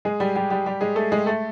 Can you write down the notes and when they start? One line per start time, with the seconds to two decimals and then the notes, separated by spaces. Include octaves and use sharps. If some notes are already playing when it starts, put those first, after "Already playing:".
0.05 G#3 G#4
0.20 G3 G4
0.35 G3 G4
0.50 G3 G4
0.66 G3 G4
0.81 G#3 G#4
0.96 A3 A4
1.12 G#3 G#4
1.26 A3 A4